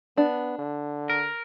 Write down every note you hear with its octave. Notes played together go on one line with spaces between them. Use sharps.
B3 D4
D3
A#4